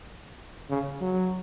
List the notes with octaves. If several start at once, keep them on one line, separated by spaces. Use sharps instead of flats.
C#3
F#3